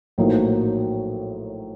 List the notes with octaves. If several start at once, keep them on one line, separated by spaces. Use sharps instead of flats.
A#1 A2 F#3 A#3 D#4